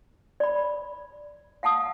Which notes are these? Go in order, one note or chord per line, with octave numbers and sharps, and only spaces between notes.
D5 B5
F5 F#5 A5 D#6 E6